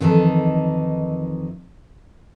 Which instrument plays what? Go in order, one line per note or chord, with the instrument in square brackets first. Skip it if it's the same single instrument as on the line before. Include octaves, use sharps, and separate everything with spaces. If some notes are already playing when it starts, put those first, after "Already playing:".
[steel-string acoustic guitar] F2 D#3 E3 D#4 G#4 A4